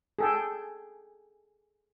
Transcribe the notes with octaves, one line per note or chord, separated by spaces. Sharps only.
G#4 A4 G5